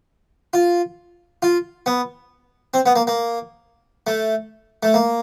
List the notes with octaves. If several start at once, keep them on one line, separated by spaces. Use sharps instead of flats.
F4
F4
B3
C4
B3
A#3
A#3
A3
A3
A#3